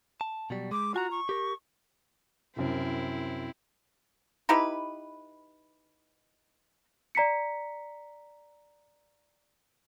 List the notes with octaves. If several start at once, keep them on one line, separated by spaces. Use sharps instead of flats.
A5
B2 F#3 G3
G#3 D6
F4 F#4 G#5 A#5
C#6
G4 A#4
C2 F#2 C4 E4 C5
D#4 E4 G4 B4
D5 A#5 B6 C#7